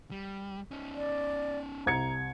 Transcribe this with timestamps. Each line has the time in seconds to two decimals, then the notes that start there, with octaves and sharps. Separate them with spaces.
0.11 G3
0.71 C#4 D#4
0.95 D5
1.86 C2 A#5 G#6 C#7